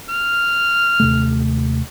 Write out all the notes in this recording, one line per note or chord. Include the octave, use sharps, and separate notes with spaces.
F6
D#2 C3 A3